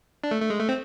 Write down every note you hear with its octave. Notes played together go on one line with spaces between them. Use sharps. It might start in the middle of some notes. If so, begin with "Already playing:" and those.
D4
A3
A3
G#3
A3
C4